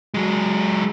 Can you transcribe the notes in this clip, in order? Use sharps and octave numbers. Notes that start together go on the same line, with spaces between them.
F#3 G#3